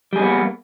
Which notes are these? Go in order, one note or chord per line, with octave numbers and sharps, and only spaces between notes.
G3 A#3 B3 D4 G#4